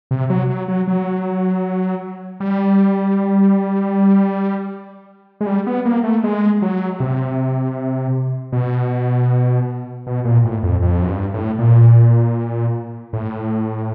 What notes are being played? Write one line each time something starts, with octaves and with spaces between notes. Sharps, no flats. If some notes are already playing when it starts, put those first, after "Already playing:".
C3
F#3
F#3
F#3
F#3
G3
G#3
G3
B3
A#3
A3
G#3
F#3
C3
B2
B2
A#2
A2
F2
F2
F#2
G2
A2
A#2
A2